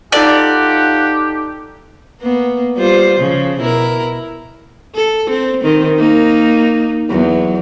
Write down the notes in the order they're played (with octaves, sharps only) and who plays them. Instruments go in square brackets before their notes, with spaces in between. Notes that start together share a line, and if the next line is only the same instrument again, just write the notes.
[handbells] D#4 A4 A5 [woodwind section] F4 F#5 [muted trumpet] G4 [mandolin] D5
[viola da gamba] A#3 B3
G3 F4 C5
C#3 F3
B2 E4 A#4
A4
C4
D#3 C4
A#3 D#4
E2 F#3